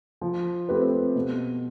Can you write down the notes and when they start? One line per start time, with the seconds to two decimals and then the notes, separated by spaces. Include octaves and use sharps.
0.21 F3
0.69 A3 C4 G4 B4
1.15 B2